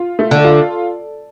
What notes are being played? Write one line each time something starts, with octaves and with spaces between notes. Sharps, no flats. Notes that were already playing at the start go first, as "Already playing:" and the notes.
Already playing: F4
A3
D3
F4